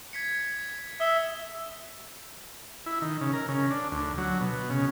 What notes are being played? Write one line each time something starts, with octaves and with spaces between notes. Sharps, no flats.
G#6 B6 C#7
E5 D#6 E6 G7
E4
D#3
C#3
A#4
C#3
D4
D2
F#3
B2
C#3